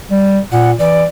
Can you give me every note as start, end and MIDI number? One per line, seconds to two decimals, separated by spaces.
0.11 0.39 55
0.52 0.73 46
0.52 0.71 78
0.79 1.04 52
0.79 1.04 74